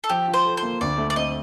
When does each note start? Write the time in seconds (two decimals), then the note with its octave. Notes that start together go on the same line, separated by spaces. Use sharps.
0.04 A4
0.09 F3 G4
0.28 F4
0.34 C5
0.45 A4
0.57 C5
0.63 A#3
0.81 D2 D5
0.98 A3
1.10 D5
1.16 C4 D#5